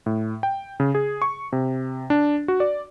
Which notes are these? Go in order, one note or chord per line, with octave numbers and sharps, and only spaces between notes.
A2
G5
C#3
G#4
C#6
C3
D4
F#4
D5